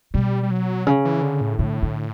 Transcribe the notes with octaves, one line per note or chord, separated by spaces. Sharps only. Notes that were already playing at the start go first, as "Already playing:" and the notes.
B2 G3
G3
F#3
C#3
E3
D3
A2
A2 D3
D3